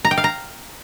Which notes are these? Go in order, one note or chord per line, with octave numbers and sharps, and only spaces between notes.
A#5
G5
F5
A#5